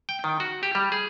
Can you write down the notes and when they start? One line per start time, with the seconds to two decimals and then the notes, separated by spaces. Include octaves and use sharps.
0.09 G5
0.24 D#3
0.40 F#4
0.63 G4
0.75 G3
0.92 G#4